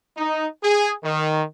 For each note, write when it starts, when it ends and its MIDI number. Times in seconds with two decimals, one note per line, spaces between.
0.17 0.47 63
0.63 0.93 68
1.04 1.43 51